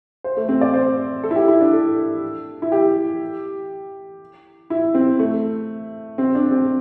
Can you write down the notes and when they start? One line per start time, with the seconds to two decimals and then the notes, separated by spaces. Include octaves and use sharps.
0.24 C5
0.37 A3
0.49 C4
0.61 D5
0.74 C5
1.24 A4
1.31 E4
1.36 G4
1.48 E4
1.61 D4
1.73 A4
2.62 E4
2.72 G4
4.70 E4
4.95 C4
5.19 A3
6.18 C4
6.35 D4
6.51 C4